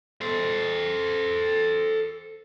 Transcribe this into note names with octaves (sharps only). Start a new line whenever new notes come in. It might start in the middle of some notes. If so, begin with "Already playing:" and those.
A4 C5